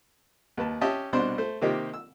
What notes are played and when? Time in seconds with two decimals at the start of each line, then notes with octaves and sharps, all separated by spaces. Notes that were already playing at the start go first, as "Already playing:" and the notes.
0.57 D#2 B4 A5
0.81 C#4 G4 D#5 E5 A5
1.13 C2 B2 D4 C5 C6
1.38 A3 C5
1.62 C3 D#3 A#3 C4 D#4 G4
1.94 E6